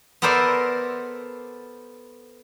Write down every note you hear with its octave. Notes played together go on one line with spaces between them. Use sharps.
B3 A4 A#4 C5 D5 E5